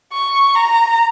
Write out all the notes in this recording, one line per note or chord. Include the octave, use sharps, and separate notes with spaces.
C#6
A#5